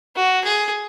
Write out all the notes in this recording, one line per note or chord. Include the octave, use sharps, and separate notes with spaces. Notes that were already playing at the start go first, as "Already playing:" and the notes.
F#4
G#4